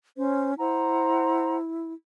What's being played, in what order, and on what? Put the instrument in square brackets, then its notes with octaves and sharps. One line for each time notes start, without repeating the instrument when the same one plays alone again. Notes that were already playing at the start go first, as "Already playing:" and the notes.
[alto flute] C#4 [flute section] C5
[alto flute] E4 [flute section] C5 F#5 A#5